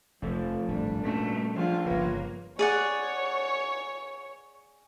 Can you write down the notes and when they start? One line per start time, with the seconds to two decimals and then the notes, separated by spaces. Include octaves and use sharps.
0.22 F1 F2 F3 A3
0.68 D1 G#1 G3 D4
1.04 A#2 G3 A3 C#4 F#4
1.56 F3 D4 F4 G#4 E5
1.86 G1 C#3 A#3 F4 B4 C#5
2.59 G#4 C#5 D5 F#5